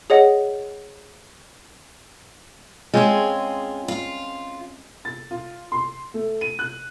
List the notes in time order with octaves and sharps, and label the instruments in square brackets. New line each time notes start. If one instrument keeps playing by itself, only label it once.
[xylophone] G#4 C#5 D#5 F#5
[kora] G#3 C4 C#4 [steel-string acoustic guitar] F4 G#4
[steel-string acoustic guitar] F4
[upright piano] A6
F4
C6
A3
D#7
F#6